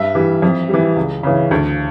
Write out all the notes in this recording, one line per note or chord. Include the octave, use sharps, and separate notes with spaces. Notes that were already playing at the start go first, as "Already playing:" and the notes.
Already playing: G2 E5
E3 G3
F2
E3 G3
C#2
C#3 E3
D2